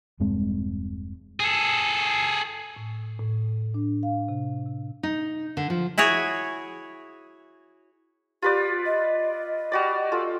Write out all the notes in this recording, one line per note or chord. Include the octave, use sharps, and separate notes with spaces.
E1 G2 G#3 C4
G#4 A4
A2
A2
D4
F5
C3
C3
D#4
D3
F3
E4 F#4 G#4 C#5
F4 G4 B4 D5
D#5
G3 F#4 D5
F4 A4